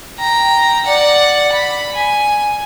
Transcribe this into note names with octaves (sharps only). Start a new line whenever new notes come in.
G5 A#5
D5 F#5
B5
G#5